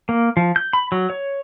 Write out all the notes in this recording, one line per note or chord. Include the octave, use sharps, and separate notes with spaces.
A#3
F3
G6
B5
F#3
C#5